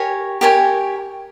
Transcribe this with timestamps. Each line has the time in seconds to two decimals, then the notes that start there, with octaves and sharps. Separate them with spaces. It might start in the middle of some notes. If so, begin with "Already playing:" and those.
Already playing: G4 A#4 C#5 G#5
0.41 G4 A#4 C#5 G#5